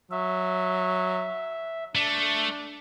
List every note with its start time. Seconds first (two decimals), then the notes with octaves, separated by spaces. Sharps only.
0.11 F#3 E5
1.95 A3 D4